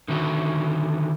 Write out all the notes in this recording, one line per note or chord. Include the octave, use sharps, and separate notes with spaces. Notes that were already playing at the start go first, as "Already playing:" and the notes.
D3 D#3 E4 F#4